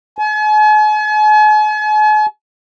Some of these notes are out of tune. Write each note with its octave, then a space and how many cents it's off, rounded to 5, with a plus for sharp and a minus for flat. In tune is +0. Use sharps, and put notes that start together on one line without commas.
G#5 +45